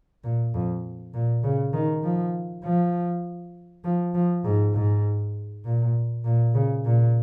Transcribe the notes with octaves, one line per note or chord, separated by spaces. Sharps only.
A#2
F2
A#2
C#3
D#3
F3
F3
F3
F3
G#2
G#2
A#2
A#2
C#3
A#2